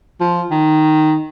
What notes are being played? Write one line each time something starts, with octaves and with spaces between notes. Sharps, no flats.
F3
D#3